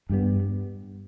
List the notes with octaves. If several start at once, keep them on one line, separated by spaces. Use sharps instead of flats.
G2 G3 B3